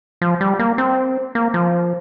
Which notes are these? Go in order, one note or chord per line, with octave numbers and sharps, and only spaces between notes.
F3
G3
A#3
C4
A#3
F3